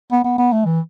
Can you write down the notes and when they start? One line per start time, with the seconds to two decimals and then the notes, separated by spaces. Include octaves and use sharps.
0.12 B3
0.24 B3
0.38 B3
0.52 A3
0.65 E3